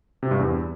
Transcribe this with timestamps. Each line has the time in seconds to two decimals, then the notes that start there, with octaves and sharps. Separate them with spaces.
0.23 C3
0.31 G2
0.39 E2